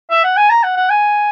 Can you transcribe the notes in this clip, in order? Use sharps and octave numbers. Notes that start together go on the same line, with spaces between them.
E5
F#5
G#5
A#5
F#5
F#5
G#5